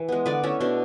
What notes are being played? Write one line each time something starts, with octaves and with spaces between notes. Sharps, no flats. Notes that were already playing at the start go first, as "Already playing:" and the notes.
Already playing: E3
G#3 B3
D3 B4 D5
A3 C#4 E4
B2 D4